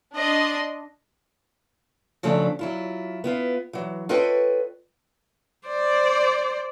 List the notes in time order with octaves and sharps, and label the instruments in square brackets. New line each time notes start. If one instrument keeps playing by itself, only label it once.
[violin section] D4 D#5 C6
[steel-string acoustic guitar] C#3 F3 F#3 A3 D4
F#3 E4 F4
B3 E4 F4
E3 F#3
F4 A4 B4 C#5 D#5 G5
[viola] C5 D5